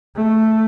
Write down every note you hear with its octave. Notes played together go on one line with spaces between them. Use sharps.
A3